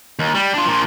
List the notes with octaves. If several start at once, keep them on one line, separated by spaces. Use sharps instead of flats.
D#2
G3
D4 F4
A#2 F3